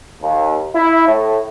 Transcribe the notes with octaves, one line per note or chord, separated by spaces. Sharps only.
D#2
E4
A2